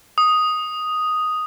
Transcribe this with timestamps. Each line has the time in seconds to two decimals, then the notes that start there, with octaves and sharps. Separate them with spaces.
0.18 D#6